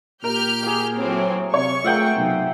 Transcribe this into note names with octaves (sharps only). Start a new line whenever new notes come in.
A#2 G4 A#4 F6 G6
A#3 G#4
A2 F#3 C4
C3 C#5 C#6
A3 F4 G#4 A#4 E5 F#5 G5
B1 C3